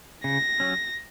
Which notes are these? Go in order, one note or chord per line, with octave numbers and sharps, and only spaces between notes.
C#3 A#6
F#3 C#4